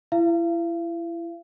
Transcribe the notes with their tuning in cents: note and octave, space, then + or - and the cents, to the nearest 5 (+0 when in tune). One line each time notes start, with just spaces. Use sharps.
E4 +30 F5 -40